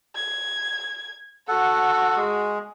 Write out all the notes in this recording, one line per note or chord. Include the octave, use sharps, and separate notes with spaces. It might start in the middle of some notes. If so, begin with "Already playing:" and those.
G#6
F#4 A4 F#5
G#3 G#4